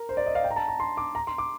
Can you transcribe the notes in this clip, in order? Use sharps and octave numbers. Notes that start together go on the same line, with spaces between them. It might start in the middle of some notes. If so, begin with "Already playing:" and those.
Already playing: A#4
C5
D5
D#5
F5
G5
A#5
A5
A#5
C6
D6
A#5
C6
D6